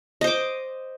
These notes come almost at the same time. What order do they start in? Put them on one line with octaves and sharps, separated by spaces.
D#5 C5 D6